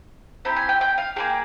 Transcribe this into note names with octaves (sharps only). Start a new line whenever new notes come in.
C4 E4 G4 A#5
G#5
G5
G5
F5
A#3 F4 G#4 G5